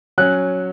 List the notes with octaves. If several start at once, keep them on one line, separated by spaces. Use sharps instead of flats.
F#3 C#4 F#6